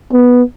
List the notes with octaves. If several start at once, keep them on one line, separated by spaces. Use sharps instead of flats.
B3